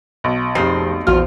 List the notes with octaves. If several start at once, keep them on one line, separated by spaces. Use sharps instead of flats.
B1
F1 F2 C4 G4 G#4 C7
A#1 E2 F4 F#4 C5 F6